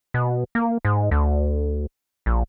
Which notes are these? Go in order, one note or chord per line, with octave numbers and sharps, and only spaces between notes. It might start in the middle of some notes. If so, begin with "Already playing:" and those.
B2
A#3
G#2
D2
A#1